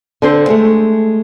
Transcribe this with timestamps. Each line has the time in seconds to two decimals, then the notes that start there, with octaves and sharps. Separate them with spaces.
0.22 D3 C4 C5
0.49 G#3 A3